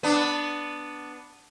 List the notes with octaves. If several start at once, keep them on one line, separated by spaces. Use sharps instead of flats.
B3 D4